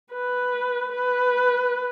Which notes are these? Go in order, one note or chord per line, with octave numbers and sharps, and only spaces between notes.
B4
B4